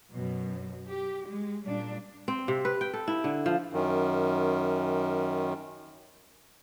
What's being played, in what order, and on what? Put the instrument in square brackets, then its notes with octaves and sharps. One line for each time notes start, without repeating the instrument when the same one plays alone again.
[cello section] F#2 B2
G4
G#3
A#2 G3 D4
[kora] C4
C3
B4
G5
A4
E4
D3
F3
[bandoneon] F#2 D#3